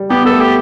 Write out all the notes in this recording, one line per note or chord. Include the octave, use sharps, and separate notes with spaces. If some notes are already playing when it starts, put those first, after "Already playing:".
Already playing: G3
B3 G4
B3 A4
A3
G4